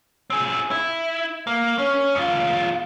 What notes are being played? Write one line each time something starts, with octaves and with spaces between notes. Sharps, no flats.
C4 G#4
E4
A#3
C#4
E2 F4